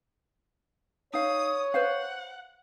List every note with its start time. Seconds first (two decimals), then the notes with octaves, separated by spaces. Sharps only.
1.13 D#4 C#5 F5 D#6
1.74 B4 C5 F5 F#5